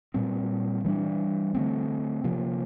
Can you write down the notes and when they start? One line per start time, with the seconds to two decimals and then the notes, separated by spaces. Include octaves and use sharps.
0.14 A#2 G3 C4
0.84 E3 G3 A#3 D4
1.55 D3 A3 C4
2.24 C3 F3 A#3